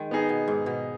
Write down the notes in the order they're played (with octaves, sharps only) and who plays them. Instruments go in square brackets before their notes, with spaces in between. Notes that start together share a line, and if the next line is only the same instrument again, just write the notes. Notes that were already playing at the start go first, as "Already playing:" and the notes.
Already playing: [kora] D#3 G#3
[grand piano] B3 D#4 G#4
[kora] B2
G#2
B2